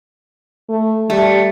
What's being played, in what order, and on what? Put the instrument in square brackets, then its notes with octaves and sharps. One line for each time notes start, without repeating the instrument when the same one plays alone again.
[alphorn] A3
[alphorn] G3 [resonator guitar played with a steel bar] A3